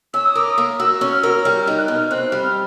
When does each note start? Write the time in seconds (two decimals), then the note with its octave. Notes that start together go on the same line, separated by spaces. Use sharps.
0.14 C#4 E6
0.25 D#6
0.35 A#4 D6
0.50 D#6
0.58 A#3
0.79 F#4 E6
1.01 C#4
1.12 F6
1.21 A#4 E6
1.30 F6
1.44 G3 F6
1.61 F6
1.67 D#4
1.78 F#6
1.88 B2
1.94 F6
2.11 C4 F#6
2.32 G3
2.44 F6